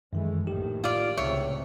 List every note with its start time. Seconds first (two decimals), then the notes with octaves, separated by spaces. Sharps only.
0.13 F#2 D#3 E3 G#3 A3
0.47 A#1 A2 D#3 G4
0.84 F4 D5
1.17 C#2 A2 C3 C#5 E5